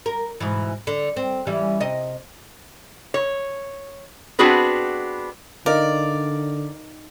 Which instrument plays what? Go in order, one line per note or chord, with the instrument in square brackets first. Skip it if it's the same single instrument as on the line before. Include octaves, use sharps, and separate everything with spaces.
[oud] A#4
G#2 B2 E3
D3
C4
E3 G3 C#4
C3 D#5
[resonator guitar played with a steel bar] C#5
B3 C4 D4 F#4 G#4 B4
[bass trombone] D3 [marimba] D#4 D#5 F5 [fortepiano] A#4 [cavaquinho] D5